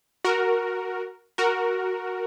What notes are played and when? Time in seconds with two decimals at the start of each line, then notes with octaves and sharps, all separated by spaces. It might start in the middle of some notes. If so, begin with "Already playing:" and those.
0.24 F#4 A#4
1.38 F#4 A#4